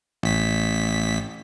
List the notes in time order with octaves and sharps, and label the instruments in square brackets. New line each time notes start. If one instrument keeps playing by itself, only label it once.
[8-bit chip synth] A1 B6